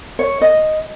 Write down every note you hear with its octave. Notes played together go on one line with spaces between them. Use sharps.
C#5
D#5